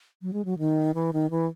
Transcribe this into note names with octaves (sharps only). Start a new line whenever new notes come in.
F#3
G#3
F#3
D#3
E3
D#3
E3